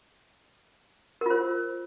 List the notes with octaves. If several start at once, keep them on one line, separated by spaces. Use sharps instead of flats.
F4 A#4 C5